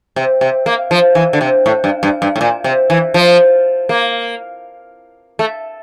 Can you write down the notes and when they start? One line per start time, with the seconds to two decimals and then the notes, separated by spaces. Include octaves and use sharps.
0.16 C3
0.41 C3
0.66 A#3
0.91 F3
1.15 E3
1.33 D3
1.41 C3
1.66 A2
1.84 G2
2.03 G2
2.22 G2
2.36 A2
2.41 A#2
2.64 C3
2.90 E3
3.14 F3
3.89 A#3
5.39 A3